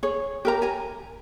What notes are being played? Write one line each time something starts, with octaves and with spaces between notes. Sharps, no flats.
G#4 C#5
G4 A#4 A#5
G#5 A#5